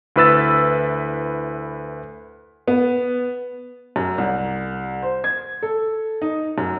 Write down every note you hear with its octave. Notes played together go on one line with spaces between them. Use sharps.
D2 E4 B4 E6 A6
B3
F#2
C2
C5
G#6
A4
D#4
F#2